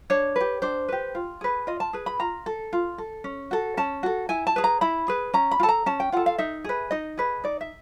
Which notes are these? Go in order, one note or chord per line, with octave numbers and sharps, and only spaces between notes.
D4 C#5
G4 B4
D4 C5
G4 B4
F4
G#4 B4
F4 D#5
A5
G#4 B4
B5
F4 A#5
A4
F4
A4
C#4
F#4 A4
C#4 A5
F#4 A4
E4 G#5
A5
G#4 B4
A#5
E4 B5
G#4 B4
C#4 A#5
B5
F4
A4 A5
A#5
C#4 A5
G5
F4 A4 F#5
F5
D#4 E5
G#4 B4
D#4 D#5
G#4 B4
D#4 D5
E5